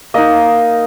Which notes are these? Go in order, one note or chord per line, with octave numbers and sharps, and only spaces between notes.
A#3 D#4 D#5